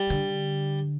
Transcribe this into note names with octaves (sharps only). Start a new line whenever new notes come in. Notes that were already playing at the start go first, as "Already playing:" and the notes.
Already playing: G3
D3